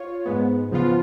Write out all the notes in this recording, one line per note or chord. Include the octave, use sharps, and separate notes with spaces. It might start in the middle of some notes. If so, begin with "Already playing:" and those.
Already playing: F4 C#5
G#2 G#3 B3
C#3 F3 B3 F4